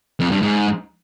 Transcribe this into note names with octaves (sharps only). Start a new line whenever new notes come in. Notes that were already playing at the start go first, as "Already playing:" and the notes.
F2
G2
G#2